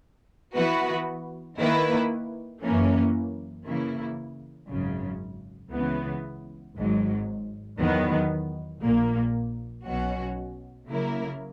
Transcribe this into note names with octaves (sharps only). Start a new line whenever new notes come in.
E3 B3 F#4 B4
D#3 A#3 E4 B4
F#2 E3 A#3 C#4
C#3 E3 A#3 E4
G#1 F#2 C#3
C#2 C#3 E3 B3
G#1 G#2 F#3
E2 D#3 F#3 B3
A#1 A#2 A#3
B1 B2 F#3 C#4 F#4
C#3 F#3 A#3 E4 A#4